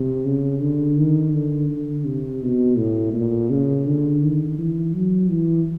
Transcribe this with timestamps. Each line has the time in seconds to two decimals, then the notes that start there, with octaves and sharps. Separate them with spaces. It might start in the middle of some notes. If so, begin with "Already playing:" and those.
Already playing: C3
0.25 C#3
0.62 D3
0.98 D#3
1.33 D3
1.70 D3
2.06 C3
2.42 B2
2.77 A2
3.14 A#2
3.50 C#3
3.86 D3
4.22 D#3
4.58 E3
4.94 F#3
5.30 E3